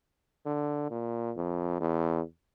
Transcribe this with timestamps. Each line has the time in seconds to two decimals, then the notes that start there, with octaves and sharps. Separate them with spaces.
0.46 D3
0.91 A#2
1.36 F2
1.80 E2